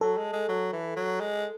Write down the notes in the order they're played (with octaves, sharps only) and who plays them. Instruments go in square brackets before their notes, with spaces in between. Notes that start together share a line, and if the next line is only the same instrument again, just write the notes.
[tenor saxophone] F#3 [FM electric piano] A4
[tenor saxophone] G#3
G#3
F#3
E3
F#3
G#3